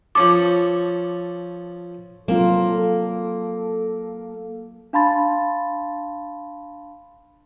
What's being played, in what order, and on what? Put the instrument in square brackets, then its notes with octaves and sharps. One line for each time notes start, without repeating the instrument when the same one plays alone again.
[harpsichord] F3 C#4 A4 [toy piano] D6
[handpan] F#3 C4 F4 [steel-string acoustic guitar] A#3 [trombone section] A4
[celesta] D4 F5 A5 B5 C6 A6